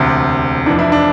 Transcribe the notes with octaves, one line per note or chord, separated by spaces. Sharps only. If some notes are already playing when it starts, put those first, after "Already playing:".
Already playing: E1 D2 C3
F1 F2 E3 D4
E4
D4